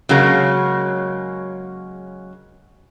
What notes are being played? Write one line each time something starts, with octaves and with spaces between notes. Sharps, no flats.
C#3 F#3 G#3 A#3